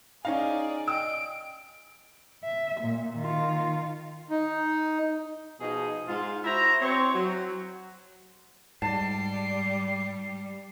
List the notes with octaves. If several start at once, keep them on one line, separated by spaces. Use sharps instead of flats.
C#4 D#4 G#4 D5 F5
D#5 G5 E6 D7
E5
A#2
D#3 F4
D#4
B2 F3 D#4 G#4
G#2 G#3 F4
E4 F#4 C5 E5 A#5
C4 C5 C#5
F#3
G#2 G3 A5 C7